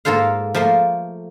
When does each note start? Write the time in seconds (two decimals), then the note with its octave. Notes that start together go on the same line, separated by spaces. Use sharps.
0.05 G#2 A#3 F4 A4 C5 F5
0.54 F3 A3 A#3 C6